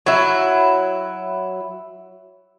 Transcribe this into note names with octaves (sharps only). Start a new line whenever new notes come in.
F#3 E4